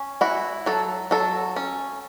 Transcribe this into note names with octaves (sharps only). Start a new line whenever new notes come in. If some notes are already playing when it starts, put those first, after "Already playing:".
Already playing: C#4
E4 F#4
F#3 A4
F#3 A4
C#4